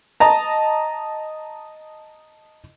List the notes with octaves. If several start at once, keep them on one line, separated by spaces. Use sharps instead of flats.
D#5 A5 A#5